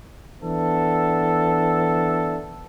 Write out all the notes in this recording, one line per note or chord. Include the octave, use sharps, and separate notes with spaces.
E3 B3 D4 A4 E5